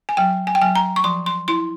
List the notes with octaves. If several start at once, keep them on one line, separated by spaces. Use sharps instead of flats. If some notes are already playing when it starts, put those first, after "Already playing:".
G#5
F#3 G5
G#5
G5
F#3 G#5
A#5
C#6
F3 C6
C6
E4 C6